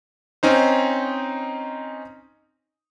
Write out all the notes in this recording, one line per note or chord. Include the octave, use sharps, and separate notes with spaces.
C4 C#4 D#4 C5